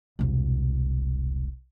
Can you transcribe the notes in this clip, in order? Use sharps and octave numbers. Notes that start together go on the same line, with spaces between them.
E1 C2